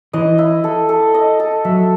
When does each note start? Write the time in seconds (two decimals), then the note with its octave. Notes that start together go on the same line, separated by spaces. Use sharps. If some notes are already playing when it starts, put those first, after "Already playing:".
0.13 E3 D#5
0.38 E4
0.64 A4
0.89 A4
1.14 D#5
1.40 A4
1.65 F#3 E5